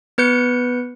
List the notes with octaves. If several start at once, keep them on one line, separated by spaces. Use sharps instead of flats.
B3 B4 G6 C#7